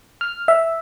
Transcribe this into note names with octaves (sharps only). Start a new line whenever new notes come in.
F6
E5